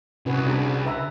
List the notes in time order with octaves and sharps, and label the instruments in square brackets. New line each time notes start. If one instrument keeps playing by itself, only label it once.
[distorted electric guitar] C2 [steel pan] C#4 F#4 B4
[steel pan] D4 G#4 A#5
B4 E5 A#5